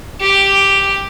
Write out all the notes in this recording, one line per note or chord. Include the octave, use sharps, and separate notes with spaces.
G4